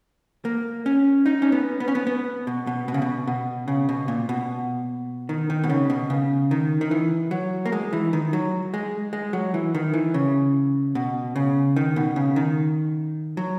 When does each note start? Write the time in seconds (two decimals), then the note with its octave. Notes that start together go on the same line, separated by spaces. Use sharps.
0.45 A#3
0.86 C#4
1.26 D#4
1.42 C#4
1.52 B3
1.80 B3
1.88 C#4
1.95 B3
2.07 B3
2.47 B2
2.67 B2
2.88 B2
2.94 C#3
3.02 B2
3.28 B2
3.68 C#3
3.89 B2
4.08 A#2
4.29 B2
5.29 D#3
5.50 D#3
5.64 B2
5.70 C#3
5.90 B2
6.10 C#3
6.51 D#3
6.81 D#3
6.91 E3
7.31 F#3
7.66 A#3
7.72 G#3
7.93 E3
8.13 D#3
8.33 F#3
8.74 G#3
9.13 G#3
9.33 F#3
9.54 E3
9.75 D#3
9.94 E3
10.14 C#3
10.95 B2
11.36 C#3
11.76 D#3
11.96 B2
12.16 C#3
12.36 D#3
13.37 F#3